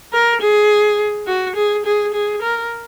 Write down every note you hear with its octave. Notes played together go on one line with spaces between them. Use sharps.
A#4
G#4
F#4
G#4
G#4
G#4
A#4